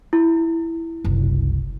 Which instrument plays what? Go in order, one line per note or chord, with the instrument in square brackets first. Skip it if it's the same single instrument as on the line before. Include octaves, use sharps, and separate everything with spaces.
[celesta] E4
[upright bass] F#1 C2